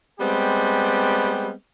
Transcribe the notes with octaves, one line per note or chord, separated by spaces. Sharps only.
G3 G#3 B3 C4 G4